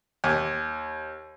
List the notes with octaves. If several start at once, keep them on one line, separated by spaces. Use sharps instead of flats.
D#2